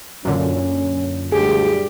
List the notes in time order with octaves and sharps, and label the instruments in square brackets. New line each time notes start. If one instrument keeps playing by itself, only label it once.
[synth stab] F#2 A#2 D3 [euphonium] C#4
[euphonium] D2 [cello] G3 G4 [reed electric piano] G#4